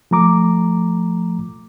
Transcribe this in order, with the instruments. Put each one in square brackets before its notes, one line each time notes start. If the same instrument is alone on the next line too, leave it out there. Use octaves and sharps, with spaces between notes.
[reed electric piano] F3 A3 A#5 D6